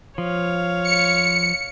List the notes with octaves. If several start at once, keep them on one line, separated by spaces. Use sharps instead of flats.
F3 C#5 F5
C#7